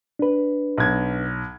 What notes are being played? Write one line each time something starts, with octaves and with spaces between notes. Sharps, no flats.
D4 B4
B1 G#6